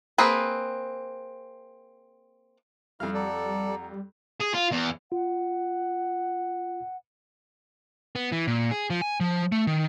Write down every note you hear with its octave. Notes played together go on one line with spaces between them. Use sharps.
A#3 C4 G#4 B4
F2 G3 E4 F5 F6
A4 D5 F#5 A#5
G#4
F4
E2
F4 F#5
B3
E3
A#2
G#4
F3
G#5
F3
A3
D#3